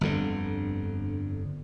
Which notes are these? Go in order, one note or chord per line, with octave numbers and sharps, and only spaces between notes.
G1 F2 D3